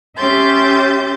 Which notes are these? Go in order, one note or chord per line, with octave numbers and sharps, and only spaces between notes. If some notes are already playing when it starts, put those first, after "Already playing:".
C#4 G4 E5 C6 G6 A6